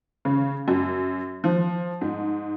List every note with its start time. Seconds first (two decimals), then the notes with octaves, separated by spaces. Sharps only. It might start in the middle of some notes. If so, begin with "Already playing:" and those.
0.25 C#3
0.68 F#2
1.44 F3
2.01 G#2